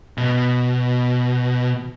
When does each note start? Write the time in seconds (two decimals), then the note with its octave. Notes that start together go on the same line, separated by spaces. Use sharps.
0.17 B2